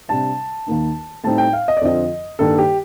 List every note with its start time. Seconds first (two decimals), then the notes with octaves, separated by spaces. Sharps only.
0.08 C3 G3 D4 A5
0.67 D#2 D#3 A#3 D#4
1.24 A2 G3 C4 D#4 A5
1.38 G5
1.53 F5
1.68 D#5
1.77 D5
1.81 F2 D3 F3 C4 D#5
2.39 G2 D#3 G3 A#3 D#4 A4
2.59 G4